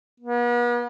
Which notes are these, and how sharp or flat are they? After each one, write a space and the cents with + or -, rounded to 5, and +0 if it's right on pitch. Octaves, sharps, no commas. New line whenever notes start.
B3 -40